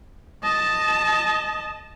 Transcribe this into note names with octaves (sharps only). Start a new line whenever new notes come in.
D#5 A5